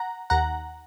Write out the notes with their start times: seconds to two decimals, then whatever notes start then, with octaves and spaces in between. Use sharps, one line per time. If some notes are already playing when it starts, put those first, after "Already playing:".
Already playing: F#5 A#5
0.30 D#2 F#5 A#5